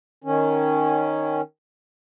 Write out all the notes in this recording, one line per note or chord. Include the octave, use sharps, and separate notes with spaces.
D#3 C#4